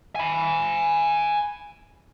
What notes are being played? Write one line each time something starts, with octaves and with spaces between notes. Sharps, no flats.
G#5 B5